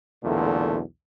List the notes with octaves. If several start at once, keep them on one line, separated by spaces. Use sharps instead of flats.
B1 E2 A#2 D3 A3